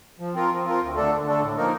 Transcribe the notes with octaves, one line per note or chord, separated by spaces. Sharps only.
F3
C4 F4 A#4
F3
C4 F4 A#4
D2
D3 A3 D4 A4
D2
D3 A3 D4 A4
A2
F3 A#3 D#4 A#4